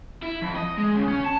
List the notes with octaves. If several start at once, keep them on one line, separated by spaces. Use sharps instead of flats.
E4
F2
D#5
G#3
C#3
C#4
A5